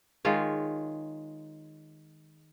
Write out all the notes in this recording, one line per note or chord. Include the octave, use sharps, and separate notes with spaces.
D#3 G#3 F4 C#5